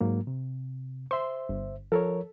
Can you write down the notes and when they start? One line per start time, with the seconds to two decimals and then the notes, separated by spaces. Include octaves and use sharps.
0.01 G#2 F#3 A#3
0.27 C3
1.11 C5 E5 C6
1.49 G1
1.92 F3 A4 A#4 C#5